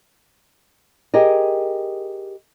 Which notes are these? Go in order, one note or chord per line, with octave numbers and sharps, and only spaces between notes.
G4 G#4 A#4 D#5